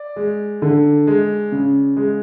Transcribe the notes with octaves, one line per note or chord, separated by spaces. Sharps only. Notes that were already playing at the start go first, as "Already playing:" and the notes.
Already playing: D5
G#3
D3
G#3
C#3
G#3